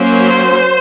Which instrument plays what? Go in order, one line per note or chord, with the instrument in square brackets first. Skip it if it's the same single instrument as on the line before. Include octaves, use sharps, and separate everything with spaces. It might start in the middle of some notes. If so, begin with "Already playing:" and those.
Already playing: [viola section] F#3 A#3 C#4 C5